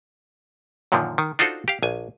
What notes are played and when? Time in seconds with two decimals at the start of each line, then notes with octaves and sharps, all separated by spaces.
0.92 F#2 A#2 D3 D#3 F3
1.18 D#3
1.39 D4 D#4 F4 F#4 A4 C5
1.68 G4 F5
1.83 A#1 G#5